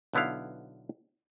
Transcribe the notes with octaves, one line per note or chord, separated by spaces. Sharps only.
B1 D3 B3 E4 F5